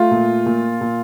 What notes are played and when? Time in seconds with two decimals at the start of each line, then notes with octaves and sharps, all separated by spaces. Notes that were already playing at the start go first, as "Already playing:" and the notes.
Already playing: A3 F4
0.11 A#2
0.46 A#2
0.81 A#2